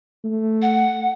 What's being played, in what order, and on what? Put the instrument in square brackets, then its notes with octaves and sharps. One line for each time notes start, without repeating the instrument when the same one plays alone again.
[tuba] A3
[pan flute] F#5